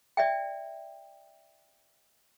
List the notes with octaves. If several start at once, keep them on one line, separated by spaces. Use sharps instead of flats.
D5 E5 G5